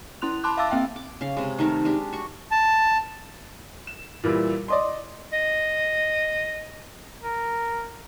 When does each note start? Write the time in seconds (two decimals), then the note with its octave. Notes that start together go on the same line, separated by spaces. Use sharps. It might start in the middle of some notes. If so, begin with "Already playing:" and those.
0.22 C#4 E4 C6 F#6 F7
0.44 A5 B5 C6 D6 F#6
0.57 E5 F5 A5 D6 E6 A6
0.71 A#3 C4 E5 G5
0.96 D6
1.21 C#3 F5
1.37 C3 G#3
1.58 D#3 A3 D#4 A#4
1.85 G#3 D4 G4
2.12 F#4 C#6
2.51 A5
3.87 E7
4.24 A#2 E3 G3 E4
4.68 D5 D#5 C6
5.33 D#5
7.22 A#4